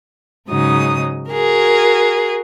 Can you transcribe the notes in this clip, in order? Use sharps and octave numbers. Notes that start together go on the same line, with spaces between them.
G#2 C#3 F#3 D#4 D#6
F#4 G#4 A#4